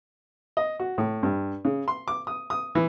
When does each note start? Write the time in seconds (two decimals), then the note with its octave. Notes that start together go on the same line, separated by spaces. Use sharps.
0.57 D#5
0.80 F#4
0.98 A2
1.23 G2
1.65 C#3
1.88 C6
2.08 D6
2.27 D#6
2.50 D#6
2.75 E3